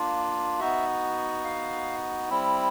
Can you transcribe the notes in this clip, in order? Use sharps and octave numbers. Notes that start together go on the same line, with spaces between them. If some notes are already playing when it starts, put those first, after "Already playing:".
Already playing: A#3 D4 F4
B3 D#4 F#4 E5
F5
G3 C4 E4